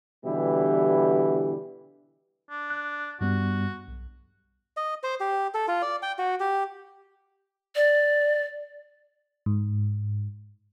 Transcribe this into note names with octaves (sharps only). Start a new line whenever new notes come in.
B2 D3 E3 G3 E4 G4
D4
F#6
G2 G3 B3 F#4
B1
D#5
C5
G4
A4
F4
D5
G5
F#4
G4
D5
G#2